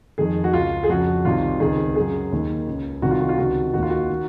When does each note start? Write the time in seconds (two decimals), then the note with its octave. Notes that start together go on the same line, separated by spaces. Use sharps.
0.18 F2 D#3 G#4
0.44 F#4
0.53 C#2 C#3 F4
0.83 G#4
0.89 F2 C#3 F#4
1.25 C2 C3 D#3 F4
1.60 C#2 C3 D#3 G#4
1.95 F#2 C#3 G#4
2.32 D#2 D#3
2.67 C#2 C#3
3.02 C2 C3 D#3 F#4
3.11 F4
3.21 F#4
3.29 F4
3.38 C#2 C3 D#3 F#4
3.73 D#3 F#4
3.77 D#2 F4
3.90 F#4
4.10 D#3